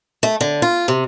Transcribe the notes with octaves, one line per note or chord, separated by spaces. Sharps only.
A3
D3
F4
C3